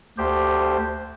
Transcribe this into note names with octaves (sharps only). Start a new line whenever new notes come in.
D2 G4 C5